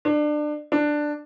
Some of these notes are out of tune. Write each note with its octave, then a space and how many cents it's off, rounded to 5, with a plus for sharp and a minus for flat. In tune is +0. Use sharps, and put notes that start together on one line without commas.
D4 +25
D4 +10